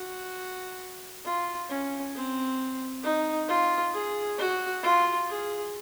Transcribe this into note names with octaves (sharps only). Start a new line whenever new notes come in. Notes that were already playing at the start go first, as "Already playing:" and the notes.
Already playing: F#4
F4
C#4
C4
D#4
F4
G#4
F#4
F4
G#4